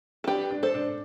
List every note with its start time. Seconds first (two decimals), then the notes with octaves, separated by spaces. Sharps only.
0.24 A4
0.27 D4 G4 B4
0.51 D4
0.63 A4 C5
0.74 D4